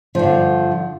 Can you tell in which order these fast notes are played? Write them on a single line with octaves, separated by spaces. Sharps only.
F3 G2 D3